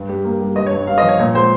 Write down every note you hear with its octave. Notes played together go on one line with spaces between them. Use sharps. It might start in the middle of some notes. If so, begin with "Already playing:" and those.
Already playing: G2
G3
A#3
G3
G2 D#5
C#5
G2
G2 F5
D#5
F3
C#5
A#2 C#5
G#3 C5